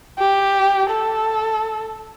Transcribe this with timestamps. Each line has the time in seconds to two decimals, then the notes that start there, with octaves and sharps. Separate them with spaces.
0.19 G4
0.90 A4